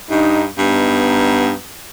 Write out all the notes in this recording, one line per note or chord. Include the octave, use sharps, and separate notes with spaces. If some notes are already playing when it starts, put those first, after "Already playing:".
G2 D#4
G2 B3 D#4